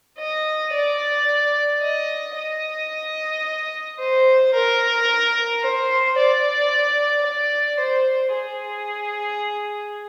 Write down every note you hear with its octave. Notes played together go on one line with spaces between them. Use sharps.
D#5
D5
D#5
D#5
C5
A#4
C5
D5
D5
C5
G#4